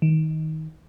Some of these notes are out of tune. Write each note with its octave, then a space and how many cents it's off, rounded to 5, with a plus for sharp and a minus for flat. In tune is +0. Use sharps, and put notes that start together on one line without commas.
D#3 +20